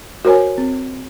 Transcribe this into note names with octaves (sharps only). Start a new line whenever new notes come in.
F#4 A#4 C5 C#5 G#5
C4